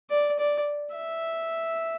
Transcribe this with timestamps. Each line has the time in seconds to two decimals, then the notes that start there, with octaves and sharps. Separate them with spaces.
0.10 D5
0.39 D5
0.96 E5